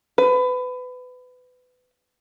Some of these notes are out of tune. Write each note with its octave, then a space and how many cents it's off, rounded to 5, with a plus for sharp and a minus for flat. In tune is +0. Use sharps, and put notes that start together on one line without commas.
B4 +25